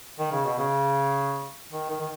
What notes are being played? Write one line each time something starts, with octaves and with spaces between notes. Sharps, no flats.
D#3
C#3
B2
C#3
D#3
D#3
D#3